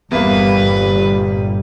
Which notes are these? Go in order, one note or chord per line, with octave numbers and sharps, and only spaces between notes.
G1 E2 A#2 G3 A#3 B4